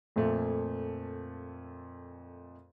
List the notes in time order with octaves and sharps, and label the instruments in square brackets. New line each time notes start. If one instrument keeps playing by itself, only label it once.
[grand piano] F2 A#2 F3 A3 A#3